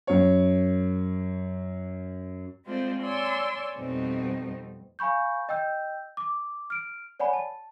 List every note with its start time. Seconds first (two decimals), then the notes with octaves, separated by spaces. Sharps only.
0.07 F#2 C#5
2.65 G#3 A3 C4 F4 C5 D5
3.03 C#5 D5 G#5 C6 E6
3.77 F2 B2 G3 A3 C4 D#4
4.99 F5 G#5 B5 C#6 G6
5.49 D#5 G5 E6 G6
6.17 D6
6.70 F6 D7
7.20 C#5 D5 F#5 G#5 B5
7.33 A5